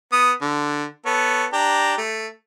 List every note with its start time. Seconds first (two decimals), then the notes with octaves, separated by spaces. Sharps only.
0.12 B3 D#6
0.42 D3
1.06 B3 A4 C#5
1.53 D4 G4 A#5
1.98 A3